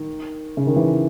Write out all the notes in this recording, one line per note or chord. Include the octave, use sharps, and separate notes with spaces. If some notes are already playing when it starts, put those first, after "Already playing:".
Already playing: D#3
C#3
D#3
E3